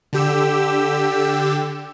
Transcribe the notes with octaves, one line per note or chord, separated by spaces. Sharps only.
D3 G4 E6